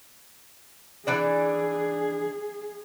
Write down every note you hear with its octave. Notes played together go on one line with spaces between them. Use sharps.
E3 D4 G#4 D5